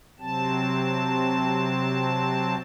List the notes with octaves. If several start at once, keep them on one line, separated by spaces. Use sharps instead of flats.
C3 F#3 C4 A5